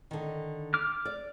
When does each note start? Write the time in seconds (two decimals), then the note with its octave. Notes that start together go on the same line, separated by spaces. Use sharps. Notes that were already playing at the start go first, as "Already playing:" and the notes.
0.11 D3 D#3
0.74 D6 F6
1.05 D5